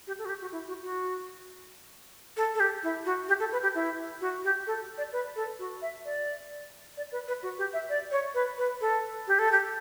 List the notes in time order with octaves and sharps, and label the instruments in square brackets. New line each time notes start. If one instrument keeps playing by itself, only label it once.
[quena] G4
A4
F#4
G4
F#4
E4
F#4
F#4
A4
A4
G4
E4
F#4
G4
A4
B4
G4
E4
F#4
G4
A4
D5
B4
A4
F#4
E5
D5
D5
B4
B4
F#4
G4
E5
D5
C#5
B4
B4
A4
G4
A4
G4